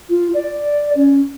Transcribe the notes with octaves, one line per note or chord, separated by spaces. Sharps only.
F4
D5
C#4